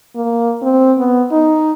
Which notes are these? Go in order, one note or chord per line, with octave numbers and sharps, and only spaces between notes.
A#3
C4
B3
D#4